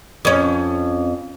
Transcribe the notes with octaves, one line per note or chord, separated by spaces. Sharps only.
F2 C#4